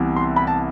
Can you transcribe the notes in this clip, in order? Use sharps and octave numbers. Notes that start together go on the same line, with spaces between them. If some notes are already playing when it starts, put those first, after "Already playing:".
Already playing: C2 C3 E3 B3 E4
C6
B5
A5